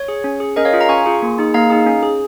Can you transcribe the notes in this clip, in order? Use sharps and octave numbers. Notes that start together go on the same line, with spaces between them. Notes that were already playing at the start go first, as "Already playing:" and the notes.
Already playing: C#5
G#4
C#4
G#4
C#4 A#4 D#5
C#5 F5
F4 G#4
F5 A#5
C#4 G#5 C#6
F4 G#4
A#3
D#4 G#4
A#3 F5 A#5
D#4 G#4
C#4
G#4